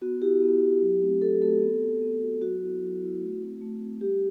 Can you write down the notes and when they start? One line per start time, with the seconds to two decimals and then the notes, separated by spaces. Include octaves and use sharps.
0.02 B3 F#4
0.22 E4 G4
0.42 B3
0.62 E4
0.82 F#3
1.01 A3 C4 F#4
1.22 F#3 A4
1.42 A3 C4 F#4 A4
1.62 B3
1.82 F#4
2.02 B3
2.21 F#4
2.41 F#3 F#4
2.62 B3 E4
2.82 F#3
3.01 B3 E4
3.21 A3
3.41 C4 F#4
3.62 A3
3.81 C4 F#4
4.01 G3 G4